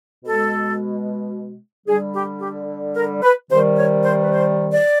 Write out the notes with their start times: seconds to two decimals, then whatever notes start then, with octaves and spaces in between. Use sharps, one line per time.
0.24 B2 G#3 A4
1.87 D3 G3 G#4
2.14 G4
2.41 G4
2.95 A#4
3.22 B4
3.50 C3 D#3 G3 C5
3.77 C#5
4.04 C5
4.22 B4
4.31 C5
4.72 D5